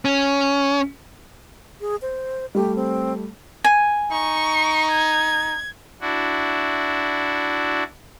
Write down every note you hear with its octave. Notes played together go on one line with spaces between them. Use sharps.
C#4
G#4
C5
G3 A3 G4
C4
G#5
D#4 C#6
G#6
D4 E4 F#4